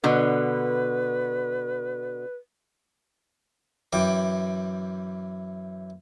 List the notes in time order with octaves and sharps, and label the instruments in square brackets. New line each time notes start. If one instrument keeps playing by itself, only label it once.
[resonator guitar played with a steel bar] B2 D3 [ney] B4
[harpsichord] F#2 E3 G5 D6